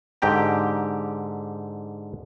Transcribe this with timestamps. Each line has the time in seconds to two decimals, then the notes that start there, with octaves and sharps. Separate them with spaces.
0.22 G#2 D3 G4 G5 A#5